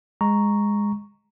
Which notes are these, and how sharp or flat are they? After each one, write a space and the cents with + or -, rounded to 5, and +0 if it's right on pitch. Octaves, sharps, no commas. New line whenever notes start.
G#3 -10 A#5 +0 C#6 +0